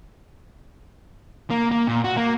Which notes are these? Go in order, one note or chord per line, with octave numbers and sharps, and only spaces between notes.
A#3
A#3
A#2
F#4
A#3